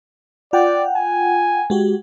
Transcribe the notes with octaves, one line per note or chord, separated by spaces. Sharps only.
F4 D5 F#5 G5
G#5
G#3 F#4 G4